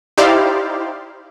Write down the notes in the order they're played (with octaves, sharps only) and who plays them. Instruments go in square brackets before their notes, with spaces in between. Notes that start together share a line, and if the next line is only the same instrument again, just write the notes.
[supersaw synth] D#4 E4 G4 C5 D5 F5